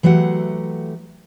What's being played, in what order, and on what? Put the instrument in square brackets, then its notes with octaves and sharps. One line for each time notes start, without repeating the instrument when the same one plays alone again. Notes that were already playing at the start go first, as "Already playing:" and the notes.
[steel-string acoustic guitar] E3 F#3 A3 G4 F#5